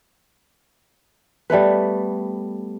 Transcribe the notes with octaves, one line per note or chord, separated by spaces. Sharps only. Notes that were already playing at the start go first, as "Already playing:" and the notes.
G3 A3 B3 B4